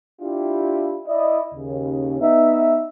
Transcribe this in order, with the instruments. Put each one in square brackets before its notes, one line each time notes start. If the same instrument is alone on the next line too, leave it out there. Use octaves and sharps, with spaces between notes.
[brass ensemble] D4 E4 F4 G4
E4 D5 D#5
D#2 C#3
B3 D#4 E5